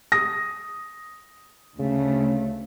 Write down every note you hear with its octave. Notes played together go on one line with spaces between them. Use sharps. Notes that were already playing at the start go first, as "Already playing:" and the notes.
D#6 A#6
D2 C#3 A3